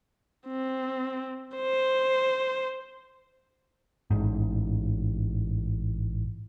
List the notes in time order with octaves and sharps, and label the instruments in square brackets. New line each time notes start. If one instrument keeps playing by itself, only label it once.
[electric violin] C4
C5
[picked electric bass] A1 G#2